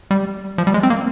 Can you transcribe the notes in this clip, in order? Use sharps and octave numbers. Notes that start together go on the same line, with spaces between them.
G3
F3
G3
G#3
C4
A#3